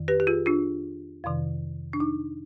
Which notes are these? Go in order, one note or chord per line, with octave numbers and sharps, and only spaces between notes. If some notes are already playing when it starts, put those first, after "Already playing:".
Already playing: F2 D#3
G4 B4
G4
F4 G#4
D4 F4
F2 C3 D#3
D4
D#4